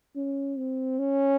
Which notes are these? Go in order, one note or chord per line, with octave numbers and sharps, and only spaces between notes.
C#4
C4
C#4